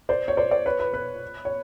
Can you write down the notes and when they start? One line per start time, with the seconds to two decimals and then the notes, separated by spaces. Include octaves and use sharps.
0.09 C5 D5
0.28 C#5
0.37 C5 D5
0.51 C5 D5
0.66 B4 C#5
0.80 B4
0.94 B4
1.45 C#5